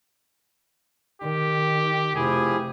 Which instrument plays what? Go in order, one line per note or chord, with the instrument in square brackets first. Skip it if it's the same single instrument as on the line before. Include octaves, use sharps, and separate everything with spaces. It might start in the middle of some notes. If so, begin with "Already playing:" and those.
[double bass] D#3 [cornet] G4
[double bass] F1 [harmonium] F3 E4 G4 [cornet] G#4